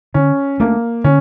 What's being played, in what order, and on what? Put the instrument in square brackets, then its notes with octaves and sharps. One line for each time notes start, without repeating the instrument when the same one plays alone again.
[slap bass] D3 [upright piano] C#4
[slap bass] A3 D4 [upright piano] A#3
[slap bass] D3 [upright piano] C#4